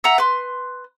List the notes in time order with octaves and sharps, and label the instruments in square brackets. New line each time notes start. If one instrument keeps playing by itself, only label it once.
[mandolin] E5 F#5 A#5
B4 C6